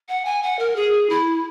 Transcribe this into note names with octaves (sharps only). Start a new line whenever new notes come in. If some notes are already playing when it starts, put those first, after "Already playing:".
F#5
G#5
F#5
A#4
G#4
E4